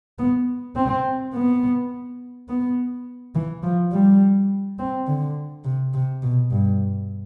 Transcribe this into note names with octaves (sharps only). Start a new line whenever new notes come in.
B3
C4
B3
B3
E3
F3
G3
C4
D3
C3
C3
B2
G2